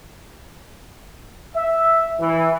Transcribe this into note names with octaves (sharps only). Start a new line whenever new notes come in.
E5
E3